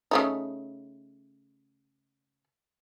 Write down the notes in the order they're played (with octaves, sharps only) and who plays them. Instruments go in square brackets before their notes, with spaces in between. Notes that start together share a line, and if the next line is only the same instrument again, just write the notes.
[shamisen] C#3 A3 D#4